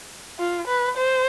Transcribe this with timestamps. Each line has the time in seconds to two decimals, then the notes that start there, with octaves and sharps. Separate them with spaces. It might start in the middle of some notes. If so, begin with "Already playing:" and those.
0.39 F4
0.67 B4
0.97 C5